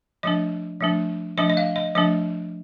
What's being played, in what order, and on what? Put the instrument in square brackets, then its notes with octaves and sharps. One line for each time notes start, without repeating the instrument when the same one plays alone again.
[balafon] F3 A3 D4 D#5
F3 A3 D4
F3 A3 D4 D#5
D#5
F5
D#5
F3 A3 D4 D#5